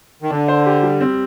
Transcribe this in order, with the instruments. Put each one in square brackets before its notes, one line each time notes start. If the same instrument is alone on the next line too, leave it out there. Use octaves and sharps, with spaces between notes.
[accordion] D#3
[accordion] D3 [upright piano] D4
[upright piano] C5
G4
G3
C4